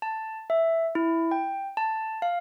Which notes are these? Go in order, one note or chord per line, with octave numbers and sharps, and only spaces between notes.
A5
E5
E4
G5
A5
F5